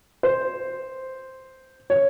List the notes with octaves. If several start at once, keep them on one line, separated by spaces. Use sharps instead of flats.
C5
C#5